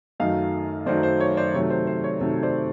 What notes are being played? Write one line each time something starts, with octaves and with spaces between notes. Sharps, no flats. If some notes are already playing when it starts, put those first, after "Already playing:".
F#2 D#3 F#3 A3 D#5 F5
F#2 D#3 F#3 A3 C5 D5
C5
C#5
C5 D5
C3 D#3 F#3 A3 C#5
C5
C5
C#5
C3 D#3 F#3 A3
C5 D5